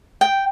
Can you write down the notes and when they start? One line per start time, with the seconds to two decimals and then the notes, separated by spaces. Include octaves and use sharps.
0.21 G5